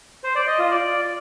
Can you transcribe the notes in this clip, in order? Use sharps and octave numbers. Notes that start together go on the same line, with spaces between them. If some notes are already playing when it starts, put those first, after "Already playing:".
C5
D5
D#5
F4
D5